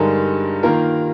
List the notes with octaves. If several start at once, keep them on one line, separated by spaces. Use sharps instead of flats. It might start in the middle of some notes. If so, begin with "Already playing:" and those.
Already playing: G2 D3 G#3 D#4 A#4
D#3 A#3 F4 A#4